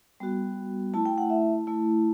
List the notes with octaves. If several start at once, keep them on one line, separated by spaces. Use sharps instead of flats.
G3 B3 F#4
A3 E4 A5
G5
F#5
E5
A3 E4